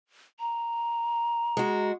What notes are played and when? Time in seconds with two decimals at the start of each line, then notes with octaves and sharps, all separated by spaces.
0.40 A#5
1.57 G#3 F#4